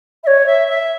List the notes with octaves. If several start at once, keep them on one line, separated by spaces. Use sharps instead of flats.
E5
C#5
E5
E5